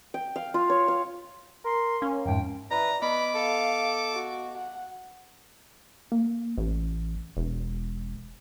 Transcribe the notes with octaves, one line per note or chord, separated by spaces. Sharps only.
G5
F5
F4
C#5
F5
A#4 C6
A#3 C#4
F2 G#2 G5
E3 B4 D5 A#5
B3 B4 D#5 B5 D6
A4 F5
F#4
F#5
A#3
A1
E1